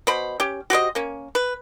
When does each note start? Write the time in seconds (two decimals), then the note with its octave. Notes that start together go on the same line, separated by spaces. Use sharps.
0.07 B2 C5 B5
0.40 C#4 G4
0.70 F#4 G4 C5 D#5
0.95 A#3 C#4
1.35 B4